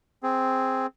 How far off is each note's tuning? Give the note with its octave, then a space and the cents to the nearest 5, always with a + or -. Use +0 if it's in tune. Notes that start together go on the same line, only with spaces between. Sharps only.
C4 +0 G#4 +0